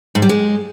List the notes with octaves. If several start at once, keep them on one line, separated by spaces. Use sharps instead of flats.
G#2
G3
G#3